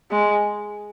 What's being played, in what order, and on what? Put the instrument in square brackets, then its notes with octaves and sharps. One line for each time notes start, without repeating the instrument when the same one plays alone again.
[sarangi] G#3